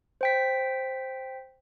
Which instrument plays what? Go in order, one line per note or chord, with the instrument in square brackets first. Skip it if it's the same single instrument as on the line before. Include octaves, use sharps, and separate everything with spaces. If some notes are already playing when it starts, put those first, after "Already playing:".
[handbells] C5 G5 B6